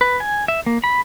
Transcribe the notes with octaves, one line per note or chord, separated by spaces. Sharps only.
B4
G#5
E5
A#3
B5